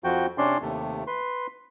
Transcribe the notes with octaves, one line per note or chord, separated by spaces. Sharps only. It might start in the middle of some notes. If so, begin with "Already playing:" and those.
F2 F3 F#4 G5
C3 C#4 D4 D5 C6
D#2 C3 A3
B4 C6